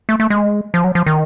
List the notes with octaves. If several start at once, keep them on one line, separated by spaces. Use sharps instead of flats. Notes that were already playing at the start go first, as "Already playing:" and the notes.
A3
A3
G#3
F3
F#3
F3
D#3